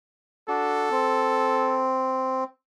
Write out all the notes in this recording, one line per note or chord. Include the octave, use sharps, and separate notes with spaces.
D4 F#4 A4
C4